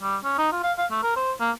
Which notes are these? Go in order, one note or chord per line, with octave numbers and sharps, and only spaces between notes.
G3
C#4
D#4
F4
F5
F5
A3
A#4
C5
A#3